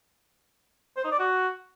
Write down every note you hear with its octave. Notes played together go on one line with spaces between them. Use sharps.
C5
D#4
D5
F#4